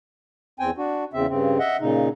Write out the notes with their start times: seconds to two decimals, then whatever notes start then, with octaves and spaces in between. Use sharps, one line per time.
0.60 E2 C4 G5 G#5
0.78 D4 F#4
1.13 E2 C#3 C4 E5
1.29 G2 C#3 C4
1.59 D#5 E5 F#5
1.81 A#2 C#3 D#4